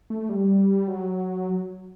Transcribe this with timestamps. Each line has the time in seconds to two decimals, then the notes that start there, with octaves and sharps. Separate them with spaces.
0.10 A3
0.29 G3
0.88 F#3